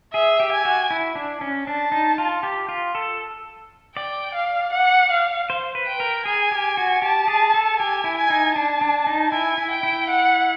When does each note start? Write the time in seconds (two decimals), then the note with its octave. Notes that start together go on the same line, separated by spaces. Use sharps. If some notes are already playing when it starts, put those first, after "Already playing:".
0.13 G#4 E5
0.40 G4
0.52 G#5
0.65 F#4
0.91 E4
1.16 D4
1.41 C#4
1.67 D4 A5
1.92 D#4
2.18 F4
2.43 G4
2.69 F4
2.95 A4
3.96 D5 G5
4.34 F5
4.72 F#5
5.11 F5
5.50 C5
5.75 B4
5.88 G5
6.00 A#4
6.25 G#4 G#5
6.52 G4
6.77 F#4
7.02 G4 A5
7.28 G#4
7.54 A4
7.79 G4 G#5
8.04 E4
8.18 G#5
8.30 D#4
8.55 D4 A5
8.81 D4
9.07 D#4
9.32 E4 G#5
9.58 E4
9.71 G5
9.83 E4
10.09 F#5